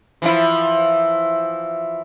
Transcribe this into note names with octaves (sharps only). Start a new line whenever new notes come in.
E3 F3 E4